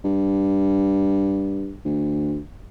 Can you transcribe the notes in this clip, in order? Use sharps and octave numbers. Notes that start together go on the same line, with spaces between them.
G2
D2